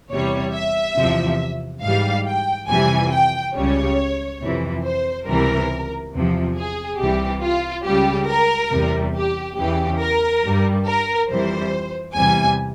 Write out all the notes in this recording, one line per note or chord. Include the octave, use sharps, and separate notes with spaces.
E2 C3 G3 C#5
E5
E2 C3 F3
G#2 E3 G3 F5
G5
F2 C3 E3 G3 G#5
G5
C#2 C#3 G3 C#5
F2 C3 E3
C5
C#2 C3 E3 G3 A#4
E2 C3 F3
G#4
C2 C3 E3 G3 G4
F4
C#2 C#3 G3 G4
A#4
E2 C3 G3
G4
E2 C#3 E3 G4
A#4
G2 G3
A#4
F2 E3 G3 C5
E2 C3 G3 G#5